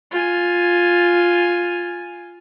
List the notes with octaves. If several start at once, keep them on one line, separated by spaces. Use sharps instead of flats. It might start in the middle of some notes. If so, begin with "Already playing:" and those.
F4 G#5